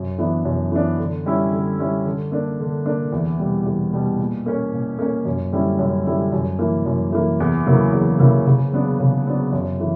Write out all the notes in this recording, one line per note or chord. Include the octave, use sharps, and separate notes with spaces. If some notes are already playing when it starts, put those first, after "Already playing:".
Already playing: F#2
E3 B3 D4
F#2
E3 B3 D4
D3
G3 C#4 E4
D3
G3 C#4 E4
D3
A#3 D4
D3
A#3 D4
E2
B2 G3
E2
B2 G3
A#2
A#3 C#4
A#2
A#3 C#4
F#2
D3 G3 C#4 E4
F#2
D3 G3 C#4 E4
F#2
E3 A#3
F#2
E3 A#3
E2
C#3 F#3 A#3 E4
E2
C#3 F#3 A#3 E4
C#3
F#3 B3 D4
C#3
F#3 B3 D4
F#2
E3